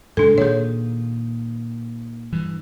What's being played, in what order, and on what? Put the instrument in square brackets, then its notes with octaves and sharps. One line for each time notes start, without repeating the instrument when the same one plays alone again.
[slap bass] G#2 C#3 G#3 [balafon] D4 A4
[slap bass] A#2 D#3 [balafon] G#4 C#5
[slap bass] G2 E3